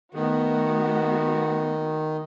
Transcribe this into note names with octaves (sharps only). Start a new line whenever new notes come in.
D#3 A3 B3 F#4